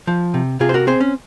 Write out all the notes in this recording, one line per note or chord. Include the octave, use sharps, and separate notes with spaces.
F3
C3
C3 F4 G#4
C5
F#4 A#4
C4 G#4 C5
C#4